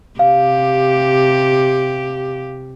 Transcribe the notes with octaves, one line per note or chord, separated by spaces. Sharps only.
C3 G4 F5